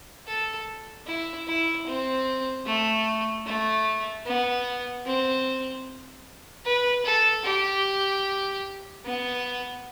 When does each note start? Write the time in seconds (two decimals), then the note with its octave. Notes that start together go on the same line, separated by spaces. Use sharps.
0.27 A4
1.07 E4
1.47 E4
1.87 C4
2.66 A3
3.46 A3
4.26 B3
5.06 C4
6.65 B4
7.05 A4
7.45 G4
9.05 B3